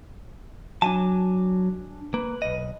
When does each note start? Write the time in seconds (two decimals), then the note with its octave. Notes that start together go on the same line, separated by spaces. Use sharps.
0.82 F#3 D4 G#5 A5
2.14 A#3 B4
2.42 B1 D#5